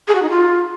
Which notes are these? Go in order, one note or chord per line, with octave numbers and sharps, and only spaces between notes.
G#4
F#4
D#4
F4